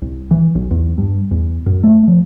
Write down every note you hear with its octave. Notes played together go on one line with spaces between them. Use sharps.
C2
E3
B1
E2
G2
E2
F#2
A3
F3